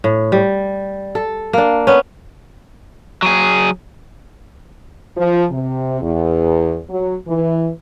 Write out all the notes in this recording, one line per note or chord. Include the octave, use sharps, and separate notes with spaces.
A2
G3
A4
A#3 D4
B3 C#4
F#3 G#4
F3
C3
E2
F#3
E3